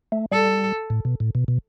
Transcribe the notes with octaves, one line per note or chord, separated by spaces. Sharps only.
A3
G3 A4
A2
B2
A2
B2
B2